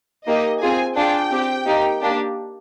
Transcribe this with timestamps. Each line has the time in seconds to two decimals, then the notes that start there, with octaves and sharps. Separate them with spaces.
0.26 A#3 D#4 G4 D#5
0.61 C4 F4 G#4 G#5
0.96 D4 F4 G#4 G5
1.31 C4 G4
1.65 A#3 D#4 G4
2.01 A#3 D4 G4